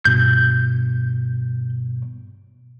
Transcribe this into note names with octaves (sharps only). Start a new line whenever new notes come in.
G2 B2 G6